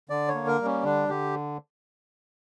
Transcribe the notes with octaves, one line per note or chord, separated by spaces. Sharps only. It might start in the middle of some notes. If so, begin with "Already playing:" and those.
D3 D5
C#5
A#3
A#4
G3
C#4
D3 D4
D3 G4